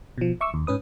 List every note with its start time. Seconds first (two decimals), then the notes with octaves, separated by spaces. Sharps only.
0.18 B2 F3
0.41 E5 C#6 D6 E6
0.54 D#2
0.67 G#2 C#4 B4 D#6